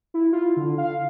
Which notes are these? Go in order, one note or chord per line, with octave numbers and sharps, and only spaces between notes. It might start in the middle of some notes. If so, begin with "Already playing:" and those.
E4
F4
D3
F5